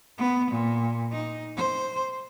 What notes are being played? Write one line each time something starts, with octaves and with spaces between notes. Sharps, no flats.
B3
A#2
D#4
C5